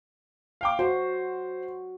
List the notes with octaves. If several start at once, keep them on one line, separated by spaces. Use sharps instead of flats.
F5 G5 D6
F#4 C5